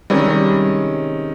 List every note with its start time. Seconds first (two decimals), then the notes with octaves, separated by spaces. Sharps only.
0.10 C3 D#3 G3 G#3 C#4